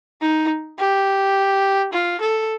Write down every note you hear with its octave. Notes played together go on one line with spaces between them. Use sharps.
D#4
G4
F4
A4